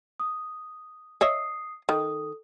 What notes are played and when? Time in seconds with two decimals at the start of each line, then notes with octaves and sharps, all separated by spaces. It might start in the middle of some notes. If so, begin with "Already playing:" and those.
0.20 D#6
1.21 C#5 D#5 E5 D#6 C7
1.89 D#3 A4 D#6